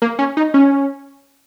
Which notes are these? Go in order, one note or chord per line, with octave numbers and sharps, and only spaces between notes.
A#3
C#4
D#4
C#4